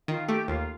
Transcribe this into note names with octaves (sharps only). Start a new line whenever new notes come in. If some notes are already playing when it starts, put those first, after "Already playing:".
D#3 F4 F5
A3 G4 G5
D#2 F4 F5